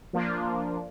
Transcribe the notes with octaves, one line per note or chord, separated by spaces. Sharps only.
F3 A#3 D4 F4